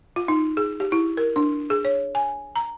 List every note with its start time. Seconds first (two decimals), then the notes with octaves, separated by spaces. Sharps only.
0.16 F4
0.28 D#4
0.57 G#4
0.80 G4
0.92 E4
1.17 A#4
1.36 D4
1.70 G#4
1.85 C#5
2.15 G#5
2.56 A#5